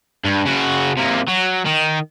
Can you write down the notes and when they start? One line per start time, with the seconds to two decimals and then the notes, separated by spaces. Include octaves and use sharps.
0.24 G2
0.45 C#3 F#4
0.97 C3 A#3
1.28 F#3
1.66 D#3